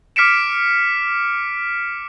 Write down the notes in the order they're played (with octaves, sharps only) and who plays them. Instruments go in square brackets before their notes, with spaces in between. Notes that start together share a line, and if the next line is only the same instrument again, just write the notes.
[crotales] D6 F6 B6 C#7 D7 E7